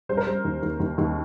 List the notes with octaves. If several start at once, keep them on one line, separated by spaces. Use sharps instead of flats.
G3 C5
A#4
G3 C5
D#2
D#2
D#2
D#2